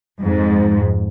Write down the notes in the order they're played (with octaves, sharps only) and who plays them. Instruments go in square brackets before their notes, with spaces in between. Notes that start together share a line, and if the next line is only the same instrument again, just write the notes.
[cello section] F2 G#2